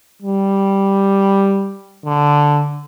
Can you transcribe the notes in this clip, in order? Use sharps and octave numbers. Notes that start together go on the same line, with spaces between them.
G3
D3